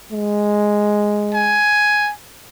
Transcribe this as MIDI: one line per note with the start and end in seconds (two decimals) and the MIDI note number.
0.12 1.59 56
1.34 2.11 80